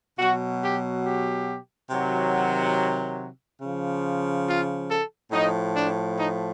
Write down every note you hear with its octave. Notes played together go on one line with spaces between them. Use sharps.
B2 F#3 F#4
G4
G4
C3 D#3 F#3
C#3 F3
F4
A4
A2 F3 D#4
D4
D#4